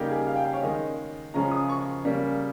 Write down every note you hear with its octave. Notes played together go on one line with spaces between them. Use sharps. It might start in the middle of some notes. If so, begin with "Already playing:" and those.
Already playing: C#3 G3 A#3 D#4 G4
G#4
F5
G5
F5
C#5
D#3 G#3 C#4 D#5
C#3 F3 G#3 C#4 A#5
D#6
C#6
C#3 G3 A#3 C#4